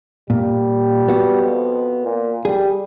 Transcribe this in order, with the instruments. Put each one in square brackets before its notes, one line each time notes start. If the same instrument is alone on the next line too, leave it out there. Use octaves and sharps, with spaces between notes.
[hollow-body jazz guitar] A#2 [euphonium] G3
[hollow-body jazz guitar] B3 F#4
[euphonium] F2
A#2
[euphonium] G3 [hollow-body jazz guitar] G#4